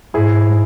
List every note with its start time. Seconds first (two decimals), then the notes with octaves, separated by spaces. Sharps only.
0.14 G#2 E4 G#4